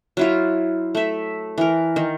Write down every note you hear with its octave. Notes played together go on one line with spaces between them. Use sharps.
F#3 E4 F4
A3 E5
E3 A#4
D#3